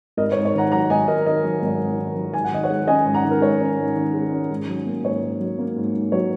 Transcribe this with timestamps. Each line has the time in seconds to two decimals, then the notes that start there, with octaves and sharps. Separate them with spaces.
0.17 G#1 A#4 D#5
0.32 C#5
0.36 G#2
0.45 C#5
0.55 D#3 F#5 A#5
0.72 F#3 F#5 A#5
0.90 G#1 D#5 G#5
1.08 G#2 A#4 D#5
1.26 D#3 A#4 D#5
1.44 F#3
1.62 G#1
1.79 G#2
1.98 D#3
2.16 F#3
2.34 G#2 G#5
2.44 F#5
2.52 D#3 D#5
2.63 C#5 F#5
2.70 G#3
2.87 C#4 D#5 G#5
3.06 G#2
3.14 F#5 A#5
3.24 D#3
3.31 A#4
3.41 G#3 C#5
3.60 C#4
3.79 G#2
3.95 D#3
4.13 G#3
4.32 C#4
4.50 G#2
4.68 F#3
4.86 A#3
5.03 G#2 C#5
5.23 G#2
5.40 F#3
5.59 A#3
5.77 G#2
5.95 G#2
6.12 F#3 C#5